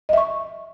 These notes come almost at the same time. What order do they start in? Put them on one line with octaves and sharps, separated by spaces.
D#5 E5 C#6